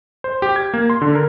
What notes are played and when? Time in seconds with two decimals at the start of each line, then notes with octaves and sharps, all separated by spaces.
0.24 C5
0.42 G4
0.56 G#6
0.74 A#3
0.90 C6
1.01 D3
1.15 A#4